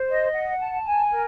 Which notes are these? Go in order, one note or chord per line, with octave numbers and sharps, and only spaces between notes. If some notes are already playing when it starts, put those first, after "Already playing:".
Already playing: C5
D#5
F#5
A5
G#5
A#4